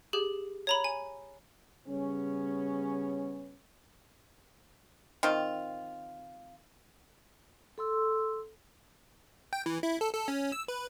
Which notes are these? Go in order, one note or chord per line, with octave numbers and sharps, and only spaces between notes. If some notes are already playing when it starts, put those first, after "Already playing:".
G4 G#4
C#5 A#5 B5
G#5
C#3 G3 B3 C#4
D#3 C4 F4
A4 C6 E6
G5
E3
E4
A4
A4
C#4
E6
B4